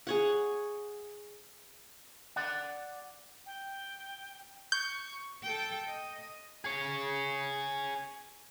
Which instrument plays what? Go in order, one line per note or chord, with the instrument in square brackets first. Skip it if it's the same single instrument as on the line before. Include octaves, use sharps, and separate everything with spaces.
[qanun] G#4 C#5 F#5
[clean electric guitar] D5 F#5
[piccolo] G5
[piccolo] C#6 [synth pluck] G6
[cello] A4 G5
D#5
[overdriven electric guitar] G#4 C#5